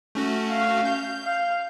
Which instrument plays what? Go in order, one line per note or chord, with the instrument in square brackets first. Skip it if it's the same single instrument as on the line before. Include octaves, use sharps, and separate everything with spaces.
[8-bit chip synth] A3 C#4 F#4
[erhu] F5
[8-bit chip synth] G6
[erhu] F5